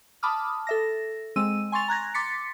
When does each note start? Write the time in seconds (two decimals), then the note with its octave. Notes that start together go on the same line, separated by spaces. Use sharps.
0.23 A5 B5 D6 D#6 F6
0.67 A4 E5 A#6
1.36 G#3 C4 E6 D#7
1.72 G#5 C6 C#6 A6 F7
1.88 A#5 F#6 G#6 A#6
2.14 C6 D6 A6 B6 C#7